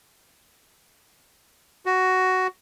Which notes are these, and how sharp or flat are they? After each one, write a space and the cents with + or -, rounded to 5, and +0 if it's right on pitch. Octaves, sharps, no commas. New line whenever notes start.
F#4 +10